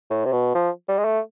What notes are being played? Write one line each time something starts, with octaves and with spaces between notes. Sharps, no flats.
A2
C3
B2
F3
G3
G#3
A3